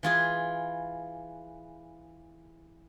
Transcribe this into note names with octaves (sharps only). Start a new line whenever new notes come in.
E3 F4 G#4